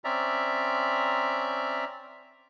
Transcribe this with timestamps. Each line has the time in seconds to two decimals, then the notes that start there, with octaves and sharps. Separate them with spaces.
0.04 C4 C#4 D5 E5 A#5